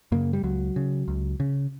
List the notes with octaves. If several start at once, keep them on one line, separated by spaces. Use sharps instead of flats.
F#2 C#3 A#3
G3
C#2 F#3
C#3
C#2
C#3